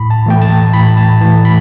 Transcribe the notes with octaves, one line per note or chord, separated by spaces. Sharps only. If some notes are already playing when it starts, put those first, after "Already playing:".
Already playing: A2 B5
A5
E3 A3 G5
A5
A2 B5
A5
E3 A3 A5
B5